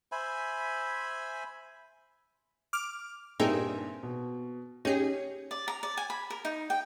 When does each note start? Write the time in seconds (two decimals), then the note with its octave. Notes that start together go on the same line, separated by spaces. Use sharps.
0.12 C5 E5 G#5 B5
2.73 D6 F6
3.40 G2 A#2 C4 D#4 G#4 A#4 E5
4.03 B2
4.85 C#4 D#4 G4 G#4
5.51 D5
5.68 A#5
5.83 D5
5.97 G#5
6.10 B5
6.30 A#4
6.45 D#4
6.70 G5